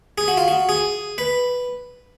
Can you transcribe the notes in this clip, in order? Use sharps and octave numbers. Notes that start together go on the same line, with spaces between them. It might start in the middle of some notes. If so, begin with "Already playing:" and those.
G#4
F#4
F4
F#4
G#4
B4